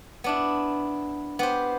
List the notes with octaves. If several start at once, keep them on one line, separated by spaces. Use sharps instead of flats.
B3 D4 E4
B3 G4 C5